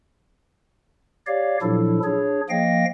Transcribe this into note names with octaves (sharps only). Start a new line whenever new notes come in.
G4 C#5 D5 F5
A#2 F3 F#3 D4 E4 A4
D4 G#4 C#5
F3 A#3 D#5 F5 G5 A#6